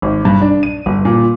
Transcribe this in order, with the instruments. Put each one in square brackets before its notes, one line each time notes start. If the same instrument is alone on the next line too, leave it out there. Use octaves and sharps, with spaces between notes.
[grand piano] G#1
G2
D4
D#7
G1
A#2